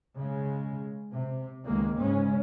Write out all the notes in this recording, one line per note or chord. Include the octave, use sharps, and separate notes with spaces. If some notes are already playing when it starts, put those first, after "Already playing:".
C#3 G#3
C3
C#2 D#3 G#3 A#3
G#2 C#3 G#3 C#4